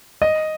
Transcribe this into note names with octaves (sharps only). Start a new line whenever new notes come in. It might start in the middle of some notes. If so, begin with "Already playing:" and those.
D#5